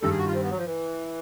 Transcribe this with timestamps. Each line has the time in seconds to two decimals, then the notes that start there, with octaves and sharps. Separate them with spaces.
0.02 G2 D#3 G3 A4
0.11 G#4
0.18 F#4
0.27 F4
0.34 C4
0.43 B3
0.50 F#3
0.58 F3
0.66 E3